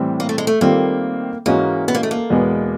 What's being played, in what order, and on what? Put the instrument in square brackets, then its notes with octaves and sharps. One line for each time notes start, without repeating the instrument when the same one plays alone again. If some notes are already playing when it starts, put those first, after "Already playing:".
Already playing: [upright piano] A2 E3 G3 C4
[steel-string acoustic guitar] A#3
A3
G#3
A3
[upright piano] D#3 G3 C4 F4 [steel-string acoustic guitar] A#3
[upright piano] G#2 E3 G#3 C#4 F#4 [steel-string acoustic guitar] A#3
[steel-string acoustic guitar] B3
A#3
A3
A#3
[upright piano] E2 B2 G#3 B3